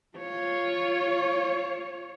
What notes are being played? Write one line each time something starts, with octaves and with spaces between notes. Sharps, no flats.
F4 C#5